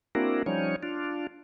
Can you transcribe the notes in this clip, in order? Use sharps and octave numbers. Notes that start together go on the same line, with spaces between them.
A#3 C4 D4 E4 F#4 A#4
F3 G3 C#4 D#4 C#5
D4 F4